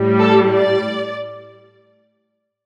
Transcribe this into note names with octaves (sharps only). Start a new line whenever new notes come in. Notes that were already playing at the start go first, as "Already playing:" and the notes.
Already playing: A2 G3
A4
D5